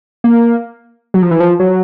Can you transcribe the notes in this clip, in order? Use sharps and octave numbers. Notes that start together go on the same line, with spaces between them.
A#3
F#3
F3
E3
F3
F#3